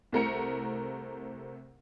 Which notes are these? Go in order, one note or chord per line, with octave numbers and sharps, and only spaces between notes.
C2 C3 A3 A#4 A#5 C#7